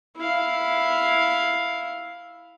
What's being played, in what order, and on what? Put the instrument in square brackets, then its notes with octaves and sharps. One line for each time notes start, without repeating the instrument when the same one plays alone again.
[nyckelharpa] E4 F5